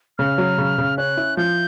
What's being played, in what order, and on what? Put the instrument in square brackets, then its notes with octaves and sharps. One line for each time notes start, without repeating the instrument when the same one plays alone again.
[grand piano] C#3 [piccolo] F6
[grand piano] F#3
C#3
C#3
[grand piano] C#4 [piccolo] F#6
[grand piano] E4
[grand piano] F3 [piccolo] G6